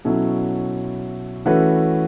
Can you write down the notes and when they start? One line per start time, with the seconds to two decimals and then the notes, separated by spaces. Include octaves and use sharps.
0.05 B2 F#3 C#4 E4 A4
1.46 E3 A3 C#4 F#4 B4